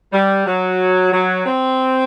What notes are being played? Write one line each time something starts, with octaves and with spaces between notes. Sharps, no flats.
G3
F#3
F#3
C4